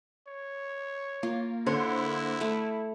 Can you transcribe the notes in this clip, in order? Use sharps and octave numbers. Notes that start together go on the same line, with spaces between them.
C#5
A#3 F4
D3 E4 C5 C#5
A3